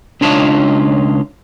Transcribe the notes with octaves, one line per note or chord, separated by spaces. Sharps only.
C#2 D4 D#4 F4 C#5 A5